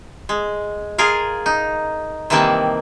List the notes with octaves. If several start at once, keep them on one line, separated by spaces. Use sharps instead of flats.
G#3
F4 G#4 A#4 F5
D#4
C3 D#3 E3 G3 A#3 A5